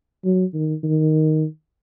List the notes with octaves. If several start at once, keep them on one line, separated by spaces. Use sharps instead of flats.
F#3
D#3
D#3